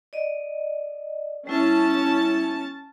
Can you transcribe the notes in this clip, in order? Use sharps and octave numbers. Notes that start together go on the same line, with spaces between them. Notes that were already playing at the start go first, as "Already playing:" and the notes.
D5 D#5
G3 C#4 E4 E5 A5